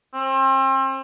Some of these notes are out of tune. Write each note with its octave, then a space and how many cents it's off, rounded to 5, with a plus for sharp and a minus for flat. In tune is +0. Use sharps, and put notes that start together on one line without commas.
C4 +35